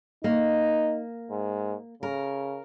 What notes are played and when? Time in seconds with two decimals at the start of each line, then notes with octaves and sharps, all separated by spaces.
0.24 A#3 D#4
1.31 G#2
2.03 C#3 A#4